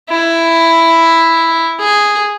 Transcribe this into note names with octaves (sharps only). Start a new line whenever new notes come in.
E4
G#4